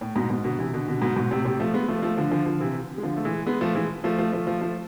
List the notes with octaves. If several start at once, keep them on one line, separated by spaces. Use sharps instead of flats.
A2
G#2 B2
G#2 B2
B2 D3
C3 E3
B2 D3
B2 D3
G#2 B2
G#2 B2
A2 C3
A2 C3
F3 A3
G#3 B3
F3 A3
F3 A3
D3 F3
D3 F3
D3 F3
C3 E3
G#3
D3 F3
A3
E3 G#3
G#3 B3
F3 A3
E3 G#3
F3 A3
F3 A3
F3 A3
F3 A3
F3 A3